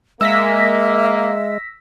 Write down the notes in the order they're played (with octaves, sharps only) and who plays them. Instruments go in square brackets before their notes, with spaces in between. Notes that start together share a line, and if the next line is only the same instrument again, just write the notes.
[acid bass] G#3 [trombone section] A#3 [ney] E5 [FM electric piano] E6 A#6 B6